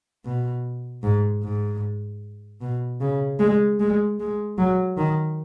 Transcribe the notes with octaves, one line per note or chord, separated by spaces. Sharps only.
B2
G#2
G#2
B2
C#3
G#3
G#3
G#3
F#3
D#3